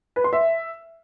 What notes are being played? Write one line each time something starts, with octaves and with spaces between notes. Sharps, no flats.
B4
C6
E5